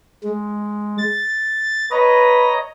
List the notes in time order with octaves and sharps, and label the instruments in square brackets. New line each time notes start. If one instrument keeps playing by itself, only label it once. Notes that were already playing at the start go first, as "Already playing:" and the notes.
[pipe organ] G#3
A6
[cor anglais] B4 [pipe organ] C#5 D#5 A#5